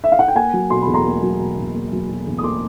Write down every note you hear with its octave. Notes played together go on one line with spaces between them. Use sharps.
E5
F5
F#5
G5
A#3 F#5 G#5
F#3
B2 C6
B5
E2
A#5 C6
A#3
F#3
B2
E2
A#3
F#3
B2
E2
D#6
A#3 C6 D6